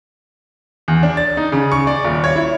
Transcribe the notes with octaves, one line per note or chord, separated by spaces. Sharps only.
E2
D4
A6
D#4
C#3
C#6
D5
D#1
C#5
E4